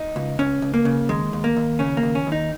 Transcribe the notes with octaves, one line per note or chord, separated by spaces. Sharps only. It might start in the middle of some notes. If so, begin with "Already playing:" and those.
Already playing: D#4
C#2
C#2 C#4
C#2
A#3
C#3
D#2 G#3
D#2
A#3
D#2
C#3 C#4
A#3
D#2
C#4
D#2
D#4